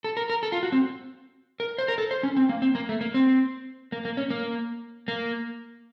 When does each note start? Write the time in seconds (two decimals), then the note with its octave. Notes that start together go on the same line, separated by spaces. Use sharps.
0.04 A4
0.17 A#4
0.30 A#4
0.43 A4
0.52 F4
0.63 F#4
0.72 C4
1.60 A#4
1.78 C5
1.88 A#4
1.98 A4
2.11 C5
2.23 C#4
2.37 C4
2.49 A#3
2.62 C4
2.75 A#3
2.89 A3
3.01 A#3
3.14 C4
3.92 A#3
4.05 A#3
4.17 C#4
4.30 A#3
5.08 A#3